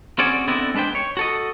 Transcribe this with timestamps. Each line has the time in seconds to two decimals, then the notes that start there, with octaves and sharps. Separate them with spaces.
0.19 C4 C#4 F#4 G#4 D5
0.48 D3 B3 C4 E4 D5 D#5
0.74 G#3 D4 B4 C5 G5
0.95 C#5
1.17 F#4 A4 D#5